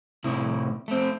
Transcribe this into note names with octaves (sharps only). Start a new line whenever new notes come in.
A2 C3 E4
A3 C4